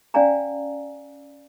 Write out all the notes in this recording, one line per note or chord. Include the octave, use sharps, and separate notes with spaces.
C#4 D5 F5 F#5 G#5 A#5